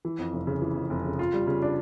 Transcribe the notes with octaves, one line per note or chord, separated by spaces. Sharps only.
E3
F2
F1
C#3
E3
F2
F1
C#3
F4
G3
C#3
D4